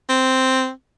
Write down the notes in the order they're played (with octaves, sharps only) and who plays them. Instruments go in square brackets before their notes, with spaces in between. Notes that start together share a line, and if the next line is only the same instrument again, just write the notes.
[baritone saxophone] C4